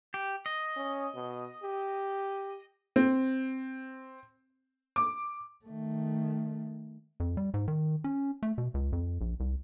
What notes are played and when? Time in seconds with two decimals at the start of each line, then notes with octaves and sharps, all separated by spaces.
0.14 G4
0.46 D#5
0.76 C#4
1.14 B2
1.63 G4
2.96 C4
4.96 D6
5.65 D#3 A3
7.20 F2
7.37 G3
7.54 G#2
7.68 D#3
8.04 C#4
8.43 A3
8.58 B2
8.74 C#2
8.93 F2
9.21 A#1
9.40 C2